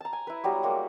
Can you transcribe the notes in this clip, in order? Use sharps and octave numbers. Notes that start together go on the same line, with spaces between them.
A5 A#5
G#5
E4 B4
F#3 G3 B3 A#5
G3 G#3 A#3 F#4